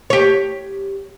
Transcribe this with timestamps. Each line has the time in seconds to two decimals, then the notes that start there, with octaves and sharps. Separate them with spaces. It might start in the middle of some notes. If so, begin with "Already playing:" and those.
0.10 G4 C#5